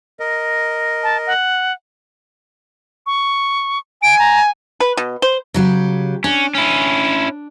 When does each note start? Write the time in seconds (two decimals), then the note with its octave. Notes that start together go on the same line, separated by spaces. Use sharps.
0.20 A#4 D#5
1.03 A5
1.27 F#5
3.06 C#6
4.03 G#5 D7
4.19 A#5
4.80 B4
4.97 B2
5.22 C5
5.54 C#3 F#3 G4
6.24 C#4 D4
6.55 C#4 E4